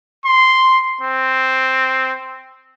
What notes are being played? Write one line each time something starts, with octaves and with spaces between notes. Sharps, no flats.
C6
C4